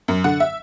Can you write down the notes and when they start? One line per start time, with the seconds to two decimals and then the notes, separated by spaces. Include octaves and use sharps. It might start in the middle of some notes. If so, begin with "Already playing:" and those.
0.08 F#2
0.24 D3 F#5
0.40 E5